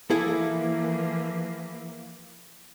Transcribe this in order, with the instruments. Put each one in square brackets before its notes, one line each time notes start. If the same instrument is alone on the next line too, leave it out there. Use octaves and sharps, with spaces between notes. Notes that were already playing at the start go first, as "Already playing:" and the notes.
[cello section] E3 F3 A#3 [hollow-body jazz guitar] E4 G#4 A4